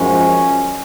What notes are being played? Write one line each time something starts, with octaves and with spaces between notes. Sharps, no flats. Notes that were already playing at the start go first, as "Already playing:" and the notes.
Already playing: F#2 F3 G#3 C#4